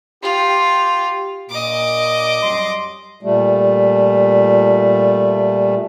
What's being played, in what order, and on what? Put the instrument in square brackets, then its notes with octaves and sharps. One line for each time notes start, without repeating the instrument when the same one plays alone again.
[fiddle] F4 [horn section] G4
[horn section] A#2 [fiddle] D#5 D6
[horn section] F#2 G3 C6
[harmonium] A#2 G3 A3